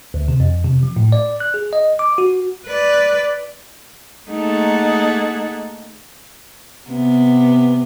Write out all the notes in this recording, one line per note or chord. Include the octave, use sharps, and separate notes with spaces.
D2
C3
F2
C3
F3
A2
D5
F#6
G#4
D#5
D6
F#4
B4 D5
A3 A#3 D#4 G#4 A4 F#5
C3 B3